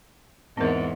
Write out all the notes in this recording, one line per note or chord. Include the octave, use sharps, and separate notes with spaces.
E2 G#2 C4 A#4